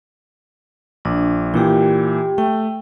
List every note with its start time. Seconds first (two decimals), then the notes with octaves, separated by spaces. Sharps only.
1.05 A#1 D4
1.54 A#2 E3 G4 G5
2.38 A3 G5